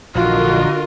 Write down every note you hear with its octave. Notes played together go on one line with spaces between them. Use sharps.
A#1 D3 E3 F4 F#4 A#4 D#5